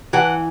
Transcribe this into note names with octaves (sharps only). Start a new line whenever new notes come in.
E3 F#5